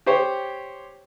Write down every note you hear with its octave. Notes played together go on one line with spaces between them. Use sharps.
G4 C5 C#5